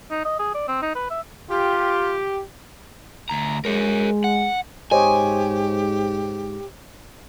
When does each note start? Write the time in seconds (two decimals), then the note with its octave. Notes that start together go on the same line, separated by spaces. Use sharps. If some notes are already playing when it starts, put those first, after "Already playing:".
0.11 D#4
0.25 D#5
0.39 G#4
0.54 D5
0.68 C4
0.82 D#4
0.95 B4
1.10 E5
1.50 F4 G4
3.29 D2 A#5
3.65 G#3 A#4 C#5
4.24 F#5
4.92 G#2 G4 C5 C#5 D#5 G#5